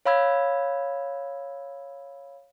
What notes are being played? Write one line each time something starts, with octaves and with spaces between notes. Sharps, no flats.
C#5 F5 B5 E6 G#6